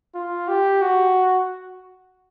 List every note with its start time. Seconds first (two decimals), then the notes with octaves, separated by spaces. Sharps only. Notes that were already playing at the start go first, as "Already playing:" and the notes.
0.14 F4
0.48 G4
0.82 F#4